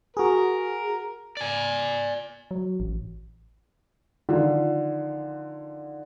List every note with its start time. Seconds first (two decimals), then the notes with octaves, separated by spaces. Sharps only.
0.17 F#4 G#4 A#4
1.37 D5 G#5
2.51 F#3
2.80 A1
4.29 D3 D#3 F3 F4